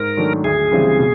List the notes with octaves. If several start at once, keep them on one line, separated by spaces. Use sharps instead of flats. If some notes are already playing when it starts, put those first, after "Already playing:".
Already playing: G#2 A#4
D#3 F#3 A3 D4
D2 G#4
C#3 E3 G3 C4
B2